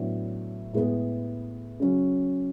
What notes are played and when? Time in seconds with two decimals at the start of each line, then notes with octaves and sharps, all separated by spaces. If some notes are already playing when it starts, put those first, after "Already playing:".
Already playing: A2 F#3 B3 D4
0.73 A2 G#3 B3
1.80 C#3 F#3 C#4